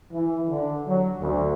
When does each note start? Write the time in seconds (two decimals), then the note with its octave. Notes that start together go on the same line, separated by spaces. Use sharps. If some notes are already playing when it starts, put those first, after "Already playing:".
0.13 E3
0.48 D3
0.87 F#3
1.20 D2